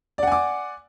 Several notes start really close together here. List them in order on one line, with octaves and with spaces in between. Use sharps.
D5 F#5 G#5 D6